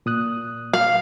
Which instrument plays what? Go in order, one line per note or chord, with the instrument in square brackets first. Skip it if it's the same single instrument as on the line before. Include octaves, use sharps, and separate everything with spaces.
[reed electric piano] A#2 D#6 F#6
[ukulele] F5